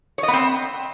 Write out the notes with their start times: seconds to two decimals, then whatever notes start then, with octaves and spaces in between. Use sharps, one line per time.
0.18 C#5
0.23 D#5
0.28 B3
0.33 C4